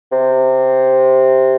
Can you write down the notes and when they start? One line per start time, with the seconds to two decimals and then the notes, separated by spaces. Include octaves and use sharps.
0.12 C3